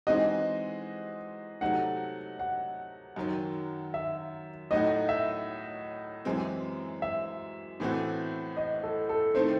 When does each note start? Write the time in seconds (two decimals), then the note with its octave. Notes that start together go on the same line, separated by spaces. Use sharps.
0.07 E3 G#3 C4 D#4 F#4 D#5
1.61 C3 F#3 A3 D#4 F#5
2.39 F#5
3.16 F#2 D#3 F#3
3.94 E5
4.71 A2 F#3 A3 D#4 F#4 D#5
5.09 E5
6.25 F#2 E3 G#3 C4
7.02 E5
7.80 A2 E3 A3 C4 F#4
8.57 D#5
8.83 A4
9.09 A4
9.35 D#3 A3 C4 E4 C5